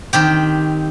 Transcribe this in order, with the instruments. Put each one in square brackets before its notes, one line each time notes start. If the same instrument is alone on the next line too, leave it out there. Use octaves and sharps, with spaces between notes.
[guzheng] D#3 C4 G4